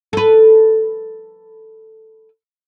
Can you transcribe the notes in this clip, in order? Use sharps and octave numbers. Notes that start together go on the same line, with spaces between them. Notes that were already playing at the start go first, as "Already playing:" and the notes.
A4 B4